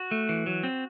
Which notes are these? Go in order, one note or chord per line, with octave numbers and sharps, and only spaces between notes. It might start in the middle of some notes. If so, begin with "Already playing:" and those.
Already playing: F#4
A3
E3
F#3
C4